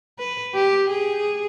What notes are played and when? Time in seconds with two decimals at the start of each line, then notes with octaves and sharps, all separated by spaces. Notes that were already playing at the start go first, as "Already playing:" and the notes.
0.19 B4
0.54 G4
0.90 G#4